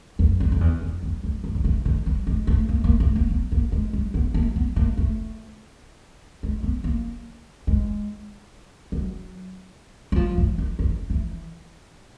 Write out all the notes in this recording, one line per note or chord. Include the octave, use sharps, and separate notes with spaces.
F2
F2
F2
E2
F2
E2
F2
G2
D3
C#3
D3
G3
G#3
A3
A#3
A#3
A3
A#3
B3
A#3
G#3
G3
B3
A#3
B3
A#3
A3
G#3
B3
A#3
G#3
F#3
F#3
F3
E3
D#3
D#3
E3